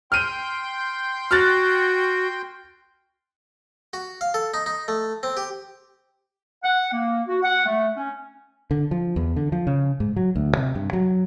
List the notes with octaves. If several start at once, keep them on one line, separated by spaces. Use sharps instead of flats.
G5 C6 F6 G6 D#7
F#4 F6 F#6 A6
F#4
F5
A4
D#4
D#4
A3
C4
G4
F#5
A#3
F#4
F#5
A3
C#4
D3
F3
E2
D3
F3
C#3
G#2
F#3
D2
C3
G2
F#3